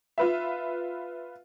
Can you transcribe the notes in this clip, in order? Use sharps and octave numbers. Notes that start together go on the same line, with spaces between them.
F4 B4 E5